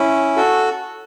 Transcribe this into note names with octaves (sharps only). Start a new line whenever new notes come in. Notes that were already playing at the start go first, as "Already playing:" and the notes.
Already playing: C#4 E4
F#4 A4